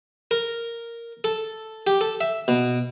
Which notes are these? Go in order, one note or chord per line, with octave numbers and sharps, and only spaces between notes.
A#4
A4
G4
A4
E5
B2